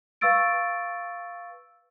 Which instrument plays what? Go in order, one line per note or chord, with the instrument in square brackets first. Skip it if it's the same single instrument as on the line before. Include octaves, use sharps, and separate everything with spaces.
[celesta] B4 F5 C#6 E6 A6 D7